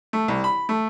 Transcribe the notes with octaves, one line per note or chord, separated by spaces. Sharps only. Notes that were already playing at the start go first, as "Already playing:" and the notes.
A3
C2
B5
A3